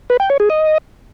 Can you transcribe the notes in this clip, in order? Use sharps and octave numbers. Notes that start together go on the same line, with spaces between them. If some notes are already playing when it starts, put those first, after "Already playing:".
B4
G5
C#5
G#4
D#5